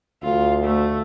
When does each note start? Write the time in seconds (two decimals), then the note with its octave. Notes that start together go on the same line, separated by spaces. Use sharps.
0.23 D2 F4
0.64 A3